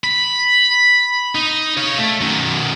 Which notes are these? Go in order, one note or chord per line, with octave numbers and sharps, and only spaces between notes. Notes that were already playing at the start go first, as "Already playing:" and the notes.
B5
D#4
C#5 F5
A3
F#2 D#3